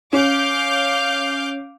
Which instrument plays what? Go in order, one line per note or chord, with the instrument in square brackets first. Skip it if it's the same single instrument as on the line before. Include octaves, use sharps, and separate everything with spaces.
[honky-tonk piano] C#4 [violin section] F5 D6 G6